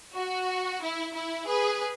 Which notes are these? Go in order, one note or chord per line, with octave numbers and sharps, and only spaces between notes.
F#4
E4
E4
G#4 B4